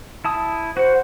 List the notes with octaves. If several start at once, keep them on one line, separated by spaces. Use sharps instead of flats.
E4 A5 D#6
F#4 C5 F#5